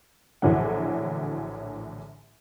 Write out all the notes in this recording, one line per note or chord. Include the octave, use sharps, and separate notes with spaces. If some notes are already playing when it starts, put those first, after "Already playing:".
A#1 A2 D3 E3 F#3 F#5